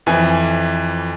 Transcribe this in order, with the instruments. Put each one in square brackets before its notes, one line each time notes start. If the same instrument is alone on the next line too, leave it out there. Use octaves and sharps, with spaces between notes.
[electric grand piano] F2 E3 G#5